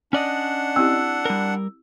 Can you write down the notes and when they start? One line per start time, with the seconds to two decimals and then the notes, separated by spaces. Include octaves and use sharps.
0.13 C#4 D4 D5 D#5 F#5
0.76 C4 E4 G4 E6
1.25 G3 A#4